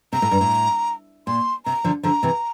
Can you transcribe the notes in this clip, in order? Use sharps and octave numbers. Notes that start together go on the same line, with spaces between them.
C3 A#5
A2
G2
A2
A#2 C6
C3 A#5
D3 F3
D3 F3 A#5
C3 E3